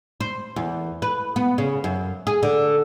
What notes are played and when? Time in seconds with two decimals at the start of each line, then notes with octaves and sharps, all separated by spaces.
0.20 C5
0.56 E2
1.02 B4
1.36 B3
1.58 C#3
1.84 F#2
2.27 G#4
2.43 D3